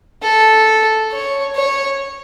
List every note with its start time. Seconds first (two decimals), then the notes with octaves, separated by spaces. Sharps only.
0.23 A4
1.12 C#5
1.55 C#5